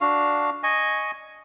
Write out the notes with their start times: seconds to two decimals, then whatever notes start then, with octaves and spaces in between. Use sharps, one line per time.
0.01 D4 F#4 F5
0.63 D#5 G#5 C#6